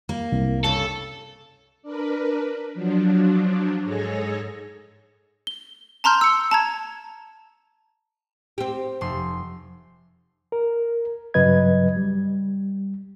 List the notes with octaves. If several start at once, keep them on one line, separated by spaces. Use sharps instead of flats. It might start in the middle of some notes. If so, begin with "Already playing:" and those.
A#3
C2
G2 C#3 A4
D4 A#4 B4
F3 F#3 D4
G#2 G#4 A4 C#5 A#6
G7
A5 A#5 C6 F6 G6
E6 C#7
A5 A#5 G#6
C4 G4
F1 C6
A#4
G2 C#3 F#3 B4 D#5 G#6
G3